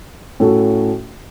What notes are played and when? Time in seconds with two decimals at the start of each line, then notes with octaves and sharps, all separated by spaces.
0.40 A2 A3 C#4 F#4 A4